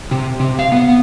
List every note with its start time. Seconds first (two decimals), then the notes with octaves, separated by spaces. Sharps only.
0.11 C3
0.40 C3
0.59 F5
0.72 B3